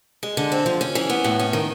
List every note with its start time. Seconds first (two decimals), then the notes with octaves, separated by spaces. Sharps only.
0.23 G#3
0.37 D3
0.52 C4
0.66 F3
0.81 C#4
0.95 E3
1.10 B3
1.24 A2
1.39 C#4
1.53 D#3